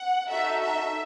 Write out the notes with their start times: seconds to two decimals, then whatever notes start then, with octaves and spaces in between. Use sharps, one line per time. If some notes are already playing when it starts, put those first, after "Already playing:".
Already playing: F#5
0.29 D#4 F#4 A4 E5
0.61 E5